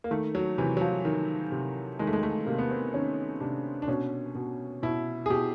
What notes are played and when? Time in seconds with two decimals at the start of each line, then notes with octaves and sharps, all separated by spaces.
0.04 A#3
0.11 D#3 A3
0.35 F#3
0.58 C3 E3
0.77 F#3
0.81 F3
1.05 D#3
1.52 C3
1.99 D#3 G#3
2.07 A3
2.13 G#3
2.23 A3
2.46 C3 A#3
2.59 B3
2.71 C4
2.94 D#3 C#4
3.40 C3 D4
3.82 D4
3.88 B2 C#4
4.35 B2
4.83 B2 E4
5.26 G#4
5.30 B2 G4